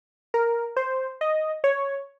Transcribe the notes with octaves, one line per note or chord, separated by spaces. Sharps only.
A#4
C5
D#5
C#5